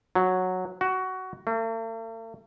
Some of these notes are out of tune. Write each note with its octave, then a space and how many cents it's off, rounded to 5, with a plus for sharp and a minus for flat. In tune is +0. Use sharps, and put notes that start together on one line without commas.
F#3 -5
F#4 +15
A3 +45